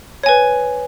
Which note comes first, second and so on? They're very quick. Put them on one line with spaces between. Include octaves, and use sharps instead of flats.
C#5 G#5 B4